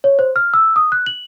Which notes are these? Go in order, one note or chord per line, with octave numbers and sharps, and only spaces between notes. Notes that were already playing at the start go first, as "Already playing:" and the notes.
C#5
C5
F6
E6
D#6
F#6
F#7